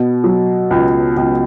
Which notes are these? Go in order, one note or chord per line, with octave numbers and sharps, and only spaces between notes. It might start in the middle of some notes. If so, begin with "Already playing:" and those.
Already playing: B2
F#3
C#2
C#2